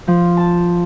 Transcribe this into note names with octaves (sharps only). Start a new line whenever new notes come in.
F3
A5